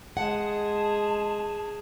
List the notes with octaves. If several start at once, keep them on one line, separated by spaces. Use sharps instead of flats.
G#3 G#4 F#5 A5